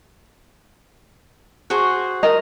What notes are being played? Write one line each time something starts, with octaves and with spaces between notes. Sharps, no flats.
F#4 G#4 C5
A#4 D#5